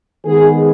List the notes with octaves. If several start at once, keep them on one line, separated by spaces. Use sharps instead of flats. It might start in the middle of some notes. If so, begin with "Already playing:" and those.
D#3 G#3 B3 G#4